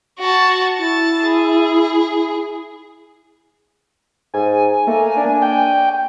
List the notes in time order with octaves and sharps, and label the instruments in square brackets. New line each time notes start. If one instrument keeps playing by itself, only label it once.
[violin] F#4 A5
[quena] E4 [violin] A5
[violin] G#4
[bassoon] G#2 [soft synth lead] G#5
[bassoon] A3 [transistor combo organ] A#3
[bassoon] D4
[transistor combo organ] G5